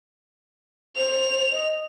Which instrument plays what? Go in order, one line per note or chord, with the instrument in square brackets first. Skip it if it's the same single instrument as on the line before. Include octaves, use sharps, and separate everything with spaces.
[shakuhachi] C5 [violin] F7
[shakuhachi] D#5